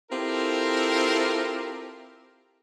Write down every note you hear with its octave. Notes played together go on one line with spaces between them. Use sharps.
C4 E4 F4 G4 A4 A#4